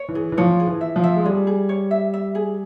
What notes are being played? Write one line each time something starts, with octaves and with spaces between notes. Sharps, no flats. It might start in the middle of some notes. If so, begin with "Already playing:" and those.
Already playing: C#5
E3
G#4
E3
F3 C#5
G#4
E3
E5
F3
E5
G#3
G3 G#4
G#4
C#5
E5
E5
G#4